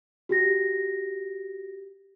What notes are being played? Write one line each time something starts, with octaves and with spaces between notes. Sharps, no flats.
F#4 G4 A#6